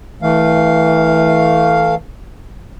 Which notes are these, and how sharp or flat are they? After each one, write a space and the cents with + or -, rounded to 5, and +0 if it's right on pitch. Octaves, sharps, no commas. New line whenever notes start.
E3 -25 A3 +0 F5 +0